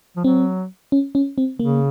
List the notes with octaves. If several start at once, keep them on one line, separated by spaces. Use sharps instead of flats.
F3
F#3 C4
C#4
C#4
C4
C#3 A#3